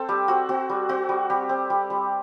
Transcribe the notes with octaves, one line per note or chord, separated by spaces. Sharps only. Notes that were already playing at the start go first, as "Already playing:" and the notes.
Already playing: C4 A4
G3 G4
C4 F#4
C4 F#4
G3
C4 F#4
G3
G3 G4
C4
G3
G3